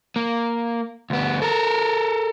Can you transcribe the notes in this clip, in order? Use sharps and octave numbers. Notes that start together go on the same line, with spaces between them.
A#3
D2 B3
A4 A#4